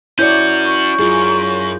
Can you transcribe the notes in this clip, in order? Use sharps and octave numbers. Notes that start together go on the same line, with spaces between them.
C#4 E4 F#4 C#5 D5 G6
C#6
F#2 F4 G#4